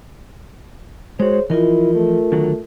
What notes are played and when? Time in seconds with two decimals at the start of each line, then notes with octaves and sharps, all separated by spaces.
1.20 G#3 F#4 G#4 C5 C#5
1.50 E3 F3 E4 F4 A#4 D#5
1.95 A3
2.32 D3 D#3 F#3